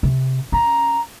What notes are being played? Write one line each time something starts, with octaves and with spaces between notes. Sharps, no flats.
C3
C#4 A#5